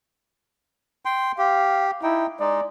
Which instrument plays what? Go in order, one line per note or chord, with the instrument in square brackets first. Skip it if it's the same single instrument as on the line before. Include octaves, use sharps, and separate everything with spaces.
[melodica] G5 C6
[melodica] G4 [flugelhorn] F5
[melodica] D#4 G5 [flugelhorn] E4
[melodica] G#3 D#4 [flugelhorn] D5